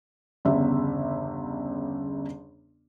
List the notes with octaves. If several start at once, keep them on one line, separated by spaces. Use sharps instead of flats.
G1 E2 C#3 E5